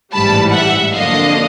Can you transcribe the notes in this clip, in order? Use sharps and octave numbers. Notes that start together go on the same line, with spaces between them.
A1 G#2 E3 G3 A5 B5
E5 F#5
F2 D3 F#3 A#3 D4 D#5 F5